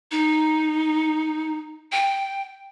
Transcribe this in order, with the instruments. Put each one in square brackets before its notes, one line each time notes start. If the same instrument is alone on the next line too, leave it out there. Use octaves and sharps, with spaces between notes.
[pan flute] D#4
G5